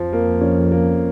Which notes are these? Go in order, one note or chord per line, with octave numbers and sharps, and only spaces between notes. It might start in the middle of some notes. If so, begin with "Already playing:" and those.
Already playing: F2 F3
A#3
C#4
A#3